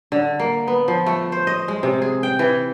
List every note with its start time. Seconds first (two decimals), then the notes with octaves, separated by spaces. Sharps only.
0.12 D3
0.40 A#3
0.68 B3
0.88 F3
1.06 A3
1.32 C5
1.47 D#5
1.68 G#3
1.83 C3
2.02 G#4
2.23 G5
2.39 E3